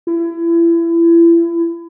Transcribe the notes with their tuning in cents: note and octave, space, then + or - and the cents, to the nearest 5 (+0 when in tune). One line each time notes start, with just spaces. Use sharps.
E4 +30